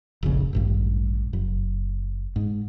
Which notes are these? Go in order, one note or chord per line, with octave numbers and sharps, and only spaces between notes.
F1 A#1 C#3
D#1 A1 G2
F#1
G#2